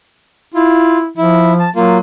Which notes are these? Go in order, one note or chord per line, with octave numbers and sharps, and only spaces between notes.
E4 F4
F3 E4
A5
F#3 A#3 F4